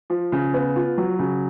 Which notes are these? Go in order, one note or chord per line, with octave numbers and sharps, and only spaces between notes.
F3
C#3
B3
F4
F#3
C#3